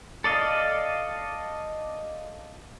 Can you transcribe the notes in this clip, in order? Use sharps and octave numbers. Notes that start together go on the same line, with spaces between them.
A4 D5 D#5 F5